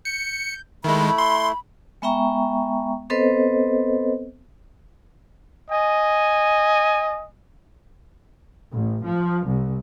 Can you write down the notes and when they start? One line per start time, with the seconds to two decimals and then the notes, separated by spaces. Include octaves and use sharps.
0.05 G6 C#7
0.84 D#3 G#3 A3 E4 B5
1.18 C6
2.02 G#3 B3 E5 G5 A#5 C#6
3.10 B3 C4 A4 B4 C5 D#5
5.71 D#5 G#5
8.73 A1
9.03 F3
9.45 C2